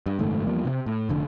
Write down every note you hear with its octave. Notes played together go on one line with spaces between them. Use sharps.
G2
F#1 G#2 D#3 A3
E2 F3 G3 A#3
C3 B3 C4
A2
F1 D3